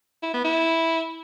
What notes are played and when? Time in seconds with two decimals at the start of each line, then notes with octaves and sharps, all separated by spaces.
0.23 E4
0.33 B3
0.44 E4